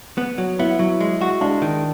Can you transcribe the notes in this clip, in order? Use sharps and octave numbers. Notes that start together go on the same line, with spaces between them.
B3
F#3
B3 E4
F#3
G#3
F#4
G#3 D4
D#3